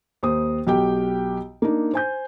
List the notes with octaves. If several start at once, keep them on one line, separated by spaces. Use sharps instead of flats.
D#2 C5 D#6
B1 G4 G5
A#3 D4 D#4
C5 G#5 G6